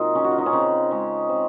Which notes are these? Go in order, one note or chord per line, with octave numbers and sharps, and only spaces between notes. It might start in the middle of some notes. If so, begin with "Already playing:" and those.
Already playing: A#2 F#3 C4 D#4 F4
C#3 C#4
F#4
F4
D#4
C#4
C#3 C4
G#3 C#4
C4